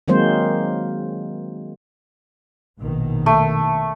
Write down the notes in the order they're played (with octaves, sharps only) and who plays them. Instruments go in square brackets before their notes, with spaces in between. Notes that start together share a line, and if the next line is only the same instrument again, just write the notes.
[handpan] D#3 F#3 G#3 A#3 C4 C5
[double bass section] A#1 B2 D#3
[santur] A3